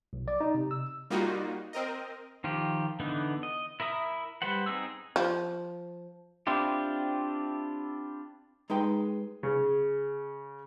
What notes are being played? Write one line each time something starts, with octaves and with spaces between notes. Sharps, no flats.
B1
D5
D#4
C3
E6
G3 A#3 D#4 F4 F#4
C4 A#4 D#5
D#3 F3 F4 G4
D3 E3 B3 D#4
D#5
E4 A#4 E5 D#6
G3 B4 C5 F#5
C4 D#4 G#4 E6
F3
C4 D4 E4 F4 G4
G#3 D#4 B4 G5
C#3